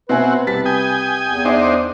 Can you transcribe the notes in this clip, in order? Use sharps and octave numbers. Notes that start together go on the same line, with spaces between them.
B2 C4 F#4 B4 E5 G#5
C2 G4 A5 B6
G5 G#5 D#6
E2
D4 D#4 C5 D5 E5